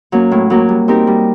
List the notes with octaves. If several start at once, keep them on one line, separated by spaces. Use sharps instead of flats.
F#3 A#3 C#4
A2
F#3 A#3
G3
C4 D#4 G4 A#4
G3